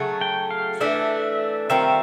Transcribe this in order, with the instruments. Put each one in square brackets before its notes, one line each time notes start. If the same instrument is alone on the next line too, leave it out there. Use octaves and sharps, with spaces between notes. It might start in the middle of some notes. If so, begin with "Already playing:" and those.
Already playing: [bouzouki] C#3 F#3 A3
[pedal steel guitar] G5
F5
[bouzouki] E3 A3 D4 [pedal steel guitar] E5
[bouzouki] D#3 G3 C4 F4 [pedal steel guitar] E5